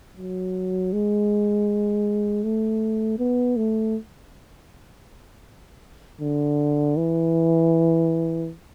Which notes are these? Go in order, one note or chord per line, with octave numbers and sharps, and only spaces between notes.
F#3
G#3
A3
B3
A3
D3
E3